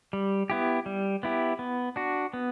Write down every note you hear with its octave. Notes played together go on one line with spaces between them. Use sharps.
G3
B3 E4 G4
G3
B3 E4 G4
B3
D4 F#4
B3